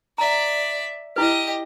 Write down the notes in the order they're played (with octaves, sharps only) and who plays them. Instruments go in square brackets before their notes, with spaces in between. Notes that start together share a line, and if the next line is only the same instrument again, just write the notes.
[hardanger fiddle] D5 E5 [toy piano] A#5
[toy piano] E4 B4 [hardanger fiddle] G4 D#5